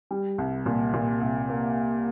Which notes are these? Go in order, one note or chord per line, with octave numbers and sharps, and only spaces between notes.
G3
C2
A#2
A#2
C2
A#3